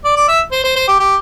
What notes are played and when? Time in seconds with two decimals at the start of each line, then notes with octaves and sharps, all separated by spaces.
0.04 D5
0.16 D5
0.28 E5
0.52 C5
0.64 C5
0.76 C5
0.88 G4
0.99 G4